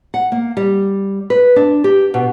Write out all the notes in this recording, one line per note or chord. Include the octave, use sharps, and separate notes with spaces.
F#5
A#3
G3
B4
D4
G4
B2